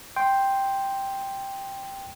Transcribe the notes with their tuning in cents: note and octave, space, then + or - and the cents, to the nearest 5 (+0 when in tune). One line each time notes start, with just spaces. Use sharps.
G5 +0 C6 +0